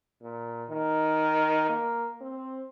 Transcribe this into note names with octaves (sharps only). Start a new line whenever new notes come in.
A#2
D#3
A#3
C4